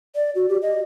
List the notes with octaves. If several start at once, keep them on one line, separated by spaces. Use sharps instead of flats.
D5
F#4
G4
D#5